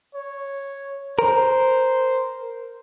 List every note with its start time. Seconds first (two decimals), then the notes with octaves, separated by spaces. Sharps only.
0.15 C#5
1.19 A#4 C5